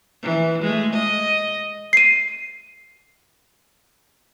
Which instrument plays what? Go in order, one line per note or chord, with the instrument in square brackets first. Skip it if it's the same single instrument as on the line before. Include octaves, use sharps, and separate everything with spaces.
[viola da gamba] E3
G#3 A3
D#5
[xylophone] C7 D#7